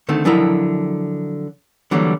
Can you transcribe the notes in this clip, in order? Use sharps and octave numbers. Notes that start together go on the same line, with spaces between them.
D3 D#3 A3 C4
D3 F3 F#3 E4 A#4
D3 E3 F#3 G3 A#3